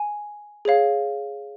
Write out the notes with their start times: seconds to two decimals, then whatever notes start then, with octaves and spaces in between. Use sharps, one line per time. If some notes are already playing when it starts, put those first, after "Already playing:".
Already playing: G#5
0.65 G#4 C#5 F5